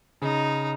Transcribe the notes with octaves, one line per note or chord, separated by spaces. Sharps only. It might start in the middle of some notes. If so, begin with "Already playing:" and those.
C#3 D#4